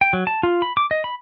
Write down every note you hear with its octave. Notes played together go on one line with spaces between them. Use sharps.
G5
F#3
A5
F4
B5
D6
D#5
B5